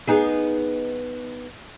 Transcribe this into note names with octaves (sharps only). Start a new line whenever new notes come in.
B3 D#4 G#4